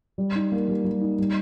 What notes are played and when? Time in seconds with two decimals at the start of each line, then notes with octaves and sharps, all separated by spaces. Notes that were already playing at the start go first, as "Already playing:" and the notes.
0.18 G3
0.35 D#4
0.52 A#3
0.68 G3
0.84 G3
1.01 D#4
1.19 G3